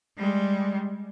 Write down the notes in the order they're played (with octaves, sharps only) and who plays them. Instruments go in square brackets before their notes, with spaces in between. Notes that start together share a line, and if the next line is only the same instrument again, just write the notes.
[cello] G3 G#3